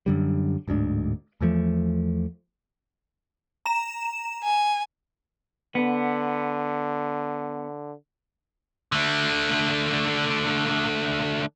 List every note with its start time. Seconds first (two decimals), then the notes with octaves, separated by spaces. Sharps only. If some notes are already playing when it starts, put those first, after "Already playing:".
0.06 F#2 D3 G3
0.68 D1 D2 G#2 D4
1.41 E2 E3 F3 A3
3.66 A#5 E7
4.43 G#5
5.75 D3 B3
8.92 D3 A3